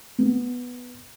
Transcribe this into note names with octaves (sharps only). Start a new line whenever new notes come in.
B3